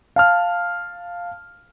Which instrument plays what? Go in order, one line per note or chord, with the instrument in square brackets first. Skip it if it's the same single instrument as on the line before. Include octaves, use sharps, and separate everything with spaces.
[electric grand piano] F5 A5 F6